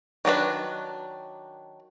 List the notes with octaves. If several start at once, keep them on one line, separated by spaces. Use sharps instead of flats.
D#3 F#3 D4 B4